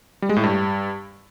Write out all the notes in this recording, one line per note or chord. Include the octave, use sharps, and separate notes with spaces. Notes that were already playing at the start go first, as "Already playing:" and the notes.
G3
G#3
A2
G2